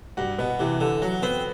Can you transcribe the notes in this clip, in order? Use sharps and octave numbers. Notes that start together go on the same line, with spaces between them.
G2 F#4
B2 B3
C3 E3
D3 A4
F#3 F#4
B3 C4